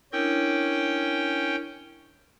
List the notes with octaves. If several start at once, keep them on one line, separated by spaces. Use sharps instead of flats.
C#4 D4 E4 A#4 G5